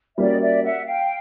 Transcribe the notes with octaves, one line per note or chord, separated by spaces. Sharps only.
G3 A#3 C#4 F#4 D5 E5
D#5
D5 E5
E5 F#5
F5 G5